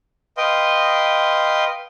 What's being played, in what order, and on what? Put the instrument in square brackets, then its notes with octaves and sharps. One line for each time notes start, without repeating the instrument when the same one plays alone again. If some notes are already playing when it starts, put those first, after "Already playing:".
[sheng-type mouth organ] B4 D#5 F5 G5 C6